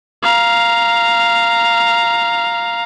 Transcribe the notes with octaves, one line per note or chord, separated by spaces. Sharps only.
F5 A#5